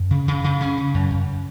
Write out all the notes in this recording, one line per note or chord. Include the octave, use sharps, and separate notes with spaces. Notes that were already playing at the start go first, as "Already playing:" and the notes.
Already playing: F#2
C#3
C#3
C#3
C#3 C#4
C#3
F#2
F#2